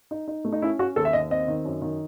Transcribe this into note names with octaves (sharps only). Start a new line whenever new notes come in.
D#4
D#4
A3
D#4
C#4 E4
C#4 F#4
D#2 A4
E5
D#2 D#5
C4 D#5
D#3
F#2
D#3